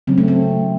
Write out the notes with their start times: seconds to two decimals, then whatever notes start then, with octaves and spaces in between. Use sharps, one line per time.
0.07 C#3 F#3 C4 C#4
0.18 A3
0.28 C4